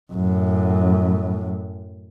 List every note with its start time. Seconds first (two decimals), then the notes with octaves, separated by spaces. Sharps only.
0.13 F#2 A2